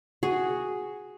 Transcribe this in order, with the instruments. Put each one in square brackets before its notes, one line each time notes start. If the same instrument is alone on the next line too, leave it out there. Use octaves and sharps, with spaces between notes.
[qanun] F#4 G#4